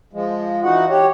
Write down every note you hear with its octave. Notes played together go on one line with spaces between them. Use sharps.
F3 G#3
E3 D#4 F#4 F#5
G4 C#5